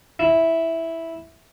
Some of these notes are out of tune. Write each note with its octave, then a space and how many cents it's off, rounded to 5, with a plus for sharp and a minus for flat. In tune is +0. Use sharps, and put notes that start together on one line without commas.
E4 -5